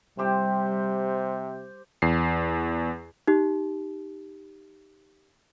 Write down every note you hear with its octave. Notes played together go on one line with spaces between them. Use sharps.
C3 G3 G4 C5
E2 C7
D#4 G4